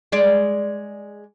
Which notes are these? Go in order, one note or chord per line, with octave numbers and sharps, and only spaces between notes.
G#3 D5